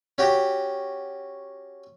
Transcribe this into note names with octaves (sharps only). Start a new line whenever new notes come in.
C#4 F#4 G4